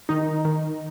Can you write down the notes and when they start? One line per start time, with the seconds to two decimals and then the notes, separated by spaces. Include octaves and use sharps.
0.09 D#3 D#4
0.45 D#3